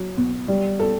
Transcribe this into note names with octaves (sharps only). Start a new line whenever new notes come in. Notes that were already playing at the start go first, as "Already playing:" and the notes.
Already playing: F#3
B2
G3
A4